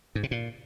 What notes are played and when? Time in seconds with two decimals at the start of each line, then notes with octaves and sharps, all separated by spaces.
0.15 G#2
0.23 C3
0.31 A#2